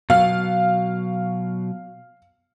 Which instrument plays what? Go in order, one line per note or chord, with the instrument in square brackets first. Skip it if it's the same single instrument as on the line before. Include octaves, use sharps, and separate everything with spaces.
[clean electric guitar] B2 F#3 [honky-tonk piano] F5